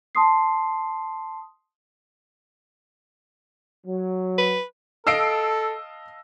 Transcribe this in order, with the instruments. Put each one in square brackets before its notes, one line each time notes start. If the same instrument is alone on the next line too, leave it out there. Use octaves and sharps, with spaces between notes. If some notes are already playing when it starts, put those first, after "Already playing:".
[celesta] A5 C6 D#6 C7
[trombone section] F#3
[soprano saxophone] B4
[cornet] A4 [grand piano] D#5 F5 A5 [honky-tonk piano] E6 C7 D7